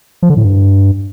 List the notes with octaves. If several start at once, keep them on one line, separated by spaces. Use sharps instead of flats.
F3
D3
A2
G2